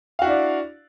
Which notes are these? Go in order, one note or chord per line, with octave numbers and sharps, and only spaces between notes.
D4 E4 F#4 D5 F5